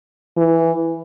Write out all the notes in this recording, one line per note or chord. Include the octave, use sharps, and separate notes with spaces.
E3